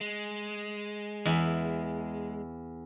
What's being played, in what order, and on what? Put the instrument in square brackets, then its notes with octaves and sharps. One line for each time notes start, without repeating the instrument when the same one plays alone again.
[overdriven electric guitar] G#3
[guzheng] E2 E4